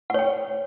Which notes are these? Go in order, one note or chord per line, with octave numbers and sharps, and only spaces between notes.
C#5 F#5 G5